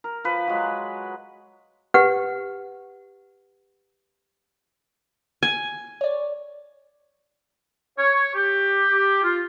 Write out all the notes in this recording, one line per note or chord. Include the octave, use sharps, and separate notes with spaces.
A#4
F3 B4
F#3 G#3
G4 B4 F#5
G#5
C#5 D5
C#5
G4
F4